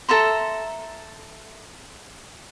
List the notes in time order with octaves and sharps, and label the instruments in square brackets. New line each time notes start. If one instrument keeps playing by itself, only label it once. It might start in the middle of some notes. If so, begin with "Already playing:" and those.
[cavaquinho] A4 E5 A#5 C6